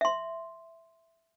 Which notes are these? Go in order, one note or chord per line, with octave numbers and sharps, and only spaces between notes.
E5 C6